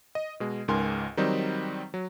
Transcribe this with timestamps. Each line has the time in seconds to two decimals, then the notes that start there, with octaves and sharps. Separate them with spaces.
0.15 D#5
0.40 B2 G#3
0.68 C#2 G#2 A#4 G#5 C6
1.17 D#3 F#3 G3 C4 D#4
1.94 F#3